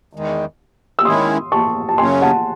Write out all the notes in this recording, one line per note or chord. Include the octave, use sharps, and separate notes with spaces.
E2 D#3 G#3
E6
D#3 G#3 C#4 E4 C6 D#6
A5 C#6
A5
F#2 C#3 F#3 C#4 G#5 C6
F#5 A5